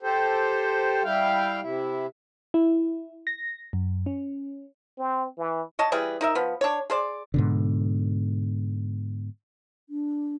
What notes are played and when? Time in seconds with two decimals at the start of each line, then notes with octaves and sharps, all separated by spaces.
0.03 G4 A4 C5
1.04 G3 E4 F5 G5
1.61 C3 E4
2.54 E4
3.27 A#6
3.73 F#2
4.06 C#4
4.98 C4
5.38 E3
5.79 C#5 D#5 A5
5.92 E3 G3 G#4 B4
6.21 D#4 A#4 E5
6.35 F3 B3
6.61 D4 C#5
6.90 G#4 C5 D5
7.34 G#2 B2 D3
9.89 D4